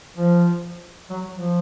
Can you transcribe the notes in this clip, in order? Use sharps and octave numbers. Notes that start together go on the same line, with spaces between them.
F3
F#3
F3